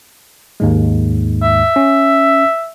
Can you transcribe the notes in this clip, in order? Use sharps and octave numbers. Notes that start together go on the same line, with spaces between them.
D#2 G#2 G#3
E5
C#4